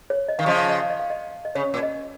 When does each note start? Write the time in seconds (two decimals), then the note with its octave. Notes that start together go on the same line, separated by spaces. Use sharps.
0.10 C#5
0.28 D#5
0.39 D#3 F5
0.46 C#3 F3 D#5
0.58 F5
0.69 D#5
0.80 F5
0.90 D#5
0.99 F5
1.10 D#5
1.45 D#5
1.55 C#3 C#5
1.74 A#2
1.83 D#5